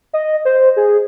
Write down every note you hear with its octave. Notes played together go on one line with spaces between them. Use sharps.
D#5
C5
G#4